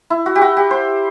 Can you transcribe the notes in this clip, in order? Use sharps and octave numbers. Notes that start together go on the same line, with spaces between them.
E4
F#4
G4
F#4
G4
C5